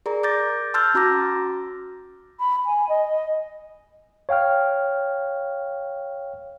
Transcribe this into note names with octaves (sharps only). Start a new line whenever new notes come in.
G#4 A#4 D5 A#5
D6 G6 A6 A#6
A5 C6 E6 F6 G6 A6
C#4 F#4 A#5 D6 A#6
B5
G#5
D#5
C#5 F5 G5 F6